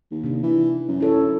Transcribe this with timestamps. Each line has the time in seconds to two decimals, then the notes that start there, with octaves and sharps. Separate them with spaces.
0.11 D#2
0.24 C3 D4
0.43 E3
0.88 F#2
1.00 E4 A4 C#5